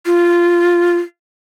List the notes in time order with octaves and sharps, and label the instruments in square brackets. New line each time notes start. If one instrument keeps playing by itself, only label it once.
[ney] F4